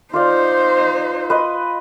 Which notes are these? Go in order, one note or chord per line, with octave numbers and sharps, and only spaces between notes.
D#4 F4 C5 D5 F5
B4 D#5 C6